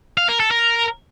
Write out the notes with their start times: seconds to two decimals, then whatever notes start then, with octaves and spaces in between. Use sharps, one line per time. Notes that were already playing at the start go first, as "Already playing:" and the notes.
0.17 F5
0.29 A#4
0.40 A4
0.51 A#4